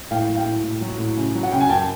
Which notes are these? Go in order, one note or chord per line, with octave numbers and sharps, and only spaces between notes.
A2 F5 G5
F#3
F5 G5
A2
A2
F#3
A2
C#3
F#3
F#5
C#3 G5
G#5
F#2 G5 A5